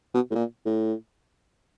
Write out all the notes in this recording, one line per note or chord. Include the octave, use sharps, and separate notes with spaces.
B2
A2
A#2
A2